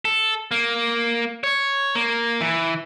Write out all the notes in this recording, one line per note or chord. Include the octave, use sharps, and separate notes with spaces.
A4
A#3
C#5
A#3
E3